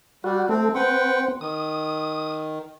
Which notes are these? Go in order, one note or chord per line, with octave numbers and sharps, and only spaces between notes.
G3 F#4
A3 C4
C4 B4 F#5 G5
D#3 D#6